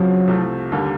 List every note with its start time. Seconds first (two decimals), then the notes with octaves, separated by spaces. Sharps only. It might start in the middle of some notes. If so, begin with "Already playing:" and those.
Already playing: F2 C#3 F3 F#3
0.27 C2 C3 F3 A3
0.72 D#2 D3 G3 A#3